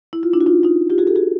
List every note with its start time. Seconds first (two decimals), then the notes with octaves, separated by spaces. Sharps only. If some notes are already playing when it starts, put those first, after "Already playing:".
0.13 E4
0.23 F4
0.33 D4 E4
0.41 F#4
0.46 D#4 F4
0.63 D#4 F4
0.90 F4 G4
0.98 F#4 G#4
1.07 G4 A4
1.16 F#4 G#4